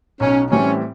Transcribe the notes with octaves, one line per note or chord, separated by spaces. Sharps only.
B1 C#4
A2 E3 G3 C4 C#4